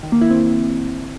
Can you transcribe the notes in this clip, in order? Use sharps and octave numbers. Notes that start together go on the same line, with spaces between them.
D#3
A#3
E4
C4